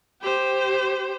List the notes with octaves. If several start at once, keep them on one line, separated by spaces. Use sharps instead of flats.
G4 C5